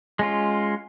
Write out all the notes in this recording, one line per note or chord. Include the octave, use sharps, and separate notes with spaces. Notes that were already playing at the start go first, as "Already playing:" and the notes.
G#3 C#4 F4